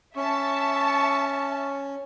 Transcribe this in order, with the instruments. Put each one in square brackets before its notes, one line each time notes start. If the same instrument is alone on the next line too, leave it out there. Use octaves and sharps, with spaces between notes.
[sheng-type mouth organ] C#4 [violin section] E5 A5 [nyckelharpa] C#6